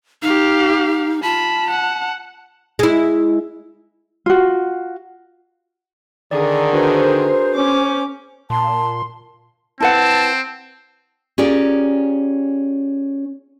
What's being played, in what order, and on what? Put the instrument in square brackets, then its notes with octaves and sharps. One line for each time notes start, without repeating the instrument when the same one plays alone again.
[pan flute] D#4 [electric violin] G4 F5
[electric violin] F4 B5 [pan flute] A5
[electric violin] F#5
[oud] G#3 E4
[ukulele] F4 F#4
[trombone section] D3 D#3 [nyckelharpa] G#4 A#4 [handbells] D5
[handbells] D4 F#4 B4 [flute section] C5
[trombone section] C#4 [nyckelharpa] D6
[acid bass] A#2 [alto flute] A5 [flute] C6
[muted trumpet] C4 [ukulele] E4 B4 F#5 [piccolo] A5
[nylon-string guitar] C#4 F4 G4 G#4 A#4 D5